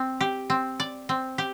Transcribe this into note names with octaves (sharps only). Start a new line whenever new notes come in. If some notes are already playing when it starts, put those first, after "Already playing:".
Already playing: C4
G4
C4
D5
C4
G4